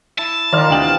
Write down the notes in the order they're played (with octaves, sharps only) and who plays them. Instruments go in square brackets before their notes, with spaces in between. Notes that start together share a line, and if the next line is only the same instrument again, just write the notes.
[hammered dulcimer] E4 [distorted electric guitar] A5
[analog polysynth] D#3 [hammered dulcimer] F4 A#4 [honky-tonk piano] D5 C6 F6
[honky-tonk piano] D2 G5 F#7 [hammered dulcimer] C3 B3 [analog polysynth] E3